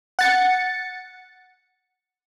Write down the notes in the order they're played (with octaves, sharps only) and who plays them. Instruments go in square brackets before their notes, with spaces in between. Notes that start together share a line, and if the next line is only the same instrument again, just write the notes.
[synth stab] F#5 A6 C#7